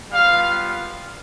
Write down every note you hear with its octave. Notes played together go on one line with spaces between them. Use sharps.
G3 B3 F4 F5